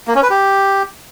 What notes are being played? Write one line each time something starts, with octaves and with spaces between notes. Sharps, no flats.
A#3
C#4
B4
G4